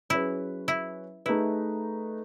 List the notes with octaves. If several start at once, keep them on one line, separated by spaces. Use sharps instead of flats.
F#3 C#4 E4 G#4 B4
E4
A3 D#4 E4 G#4 B4